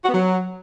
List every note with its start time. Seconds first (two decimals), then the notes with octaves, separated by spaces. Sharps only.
0.04 F#4
0.09 B3
0.14 F#3